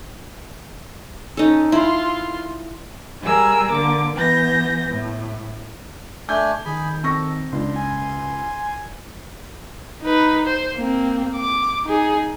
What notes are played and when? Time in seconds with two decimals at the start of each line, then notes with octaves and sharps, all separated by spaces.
1.37 C#4 D#4 A4
1.72 E4 F4 C6
3.21 G3 G#4 A#4 E6
3.72 D3 A#3 D6
4.16 E3 B3 G6 A#6
4.91 A2
6.29 A3 D4 G#5 G6
6.65 D#3 G#4 G#5 B5
7.03 C4 A4 C#6 A#6
7.52 C#2 D4 C6
7.76 G#5
10.02 D#4 B4
10.47 C5
10.76 A#3 C4
11.37 D6
11.85 D#4 G#4